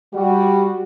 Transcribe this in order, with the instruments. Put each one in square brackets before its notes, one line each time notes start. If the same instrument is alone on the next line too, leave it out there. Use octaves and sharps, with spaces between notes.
[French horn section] G3 F#4